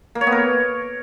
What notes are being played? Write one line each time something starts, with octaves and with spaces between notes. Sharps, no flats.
A#3
C#5
B3
A#4